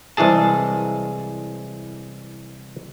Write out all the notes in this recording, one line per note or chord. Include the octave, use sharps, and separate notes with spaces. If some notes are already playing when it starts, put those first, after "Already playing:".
C2 E3 G#3 G#4 A5